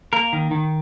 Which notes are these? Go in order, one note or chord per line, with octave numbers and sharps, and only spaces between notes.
A#3 A#4
D#3
D#3